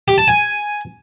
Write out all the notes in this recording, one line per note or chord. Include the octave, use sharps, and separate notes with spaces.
G4
A5
G#5